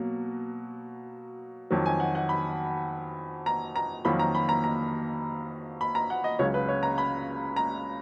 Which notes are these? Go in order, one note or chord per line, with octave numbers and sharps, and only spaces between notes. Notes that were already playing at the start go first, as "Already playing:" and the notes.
Already playing: B2 F#3 A#3
F2 D#3 F#3
G#5
F#5
F#5
B5
A#5
A#5
F2 D#3 F#3 A#3 B5
A#5
B5
A#5
A#5
B5
A#5
F#5
D#5
C#2 C#3 F#3 C#5
B4
C#5
A#5
B5
A#5